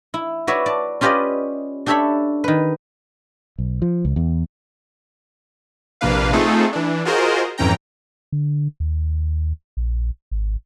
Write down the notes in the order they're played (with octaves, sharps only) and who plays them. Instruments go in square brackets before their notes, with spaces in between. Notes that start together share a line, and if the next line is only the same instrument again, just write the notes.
[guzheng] E4
F#4 B4 C#5 D5 E5
D5 A5
C#4 F4 G4 B4 D5 D#5
D4 G4 A4 C#5 E5 B5
D#3 B4
[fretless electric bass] B1
F3
C#2
E2
[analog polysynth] A#1 C3 A#3 D4 B4 F5
A3 C4 D#4 F4 G#4 A4
E3 D4
F4 F#4 G#4 A#4 C5 D#5
F2 G#2 E3 C#4 G5 A#5
[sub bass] D3
D#2
A#1
G#1